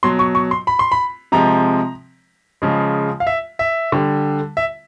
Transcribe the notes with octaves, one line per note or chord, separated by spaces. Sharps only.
B2 F#3 C6
C#6
C#6
C6
B5
C6
B5
C3 F3 G#3 A#5
C#3 F3 G#3
F5
E5
E5
D3 G3
E5